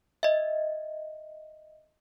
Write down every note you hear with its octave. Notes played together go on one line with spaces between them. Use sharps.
D#5 E5